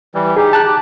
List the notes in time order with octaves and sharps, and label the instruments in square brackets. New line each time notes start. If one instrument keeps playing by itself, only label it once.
[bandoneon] E3 G3
[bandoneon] D#4 G4 [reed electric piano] G#4
[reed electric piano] A5 F#6
[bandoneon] G4